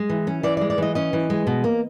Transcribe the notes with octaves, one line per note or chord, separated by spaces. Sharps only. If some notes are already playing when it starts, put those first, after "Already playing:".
Already playing: G#3
E3
C#4
E3 D5
D5
G#3
D5
E3 D#5
C#4 D#5
E3
G#3
B2
A#3